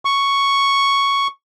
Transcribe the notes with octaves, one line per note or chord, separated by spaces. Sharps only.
C#6